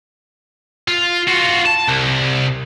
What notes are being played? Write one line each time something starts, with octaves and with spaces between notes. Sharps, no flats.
F4
F4 F#4
A5
C2